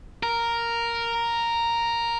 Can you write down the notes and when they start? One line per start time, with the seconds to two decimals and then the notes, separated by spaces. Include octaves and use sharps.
0.23 A#4